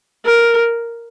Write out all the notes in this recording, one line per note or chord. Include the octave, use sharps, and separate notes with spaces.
A#4